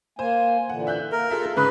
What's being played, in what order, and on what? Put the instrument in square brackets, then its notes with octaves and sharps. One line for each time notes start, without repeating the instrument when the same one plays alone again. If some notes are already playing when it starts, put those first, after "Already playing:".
[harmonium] A#3 G#5 [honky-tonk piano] C5
[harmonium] A#2 D3 E3 [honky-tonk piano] F#5
[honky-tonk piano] E5 F#6 G6
[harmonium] A#3 [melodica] A#4
[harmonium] F4 [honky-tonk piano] G#4 A4 E5
[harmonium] F2 [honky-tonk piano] G#2 C#3 D#6 [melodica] B4